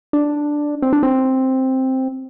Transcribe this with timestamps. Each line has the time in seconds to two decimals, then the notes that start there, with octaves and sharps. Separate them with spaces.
0.13 D4
0.82 C4
0.93 D4
1.03 C4